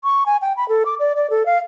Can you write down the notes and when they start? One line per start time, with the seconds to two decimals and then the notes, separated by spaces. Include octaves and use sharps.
0.04 C#6
0.26 G#5
0.42 G5
0.57 B5
0.69 A4
0.86 D6
0.99 D5
1.16 D5
1.30 A4
1.46 F5